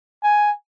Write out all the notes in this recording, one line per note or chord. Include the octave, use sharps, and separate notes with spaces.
G#5